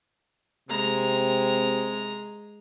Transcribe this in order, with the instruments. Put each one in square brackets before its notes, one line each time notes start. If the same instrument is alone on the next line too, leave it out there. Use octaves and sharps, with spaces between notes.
[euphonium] C3 [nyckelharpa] G#3 A#5